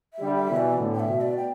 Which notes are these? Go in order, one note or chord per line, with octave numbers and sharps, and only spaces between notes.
E5
D3 G3
E5
B2 E3
D5
A2 D3
G5
E5
B2
D5
G5